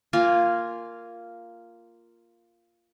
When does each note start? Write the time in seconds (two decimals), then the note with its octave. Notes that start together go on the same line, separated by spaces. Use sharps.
0.13 A#3 F4 G#5